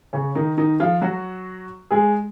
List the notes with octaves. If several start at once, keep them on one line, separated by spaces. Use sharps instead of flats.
C#3 C#4
D#3 D#4
D#3 D#4
F3 F4
F#3 F#4
G#3 G#4